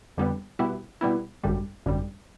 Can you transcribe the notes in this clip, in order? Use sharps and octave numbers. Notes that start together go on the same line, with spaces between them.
F2 D3 G3 B3
B2 G3 B3 E4
B2 G3 B3 E4
G#1 F#2 D3 G3
G#1 F#2 D3 G3